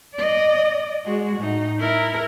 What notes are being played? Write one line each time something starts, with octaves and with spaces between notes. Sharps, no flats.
D5 D#5
G#3 F#4
A2 D#4
E4 A#4